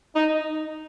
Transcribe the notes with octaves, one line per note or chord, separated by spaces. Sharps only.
D#4